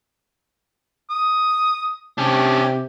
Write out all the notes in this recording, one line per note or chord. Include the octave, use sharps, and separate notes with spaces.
D#6
C3 C#4 D4 G4